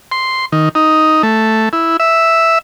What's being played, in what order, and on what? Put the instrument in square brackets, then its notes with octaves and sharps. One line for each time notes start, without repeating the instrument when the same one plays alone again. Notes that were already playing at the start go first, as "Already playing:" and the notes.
[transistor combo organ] C6
D#3
D#4
A3
E4
E5